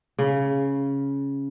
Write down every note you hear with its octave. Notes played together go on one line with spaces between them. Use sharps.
C#3